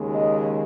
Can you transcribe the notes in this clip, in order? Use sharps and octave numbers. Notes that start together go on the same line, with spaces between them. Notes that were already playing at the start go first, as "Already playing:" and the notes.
Already playing: D#2 C#3 G#3
D#5